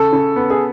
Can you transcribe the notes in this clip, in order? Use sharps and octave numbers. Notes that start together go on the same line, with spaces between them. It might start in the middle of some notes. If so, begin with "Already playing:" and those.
Already playing: C#3 A4
C#3
B3
G#4